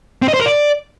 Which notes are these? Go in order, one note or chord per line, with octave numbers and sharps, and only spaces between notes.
C4
D#5
C5
A#4
D5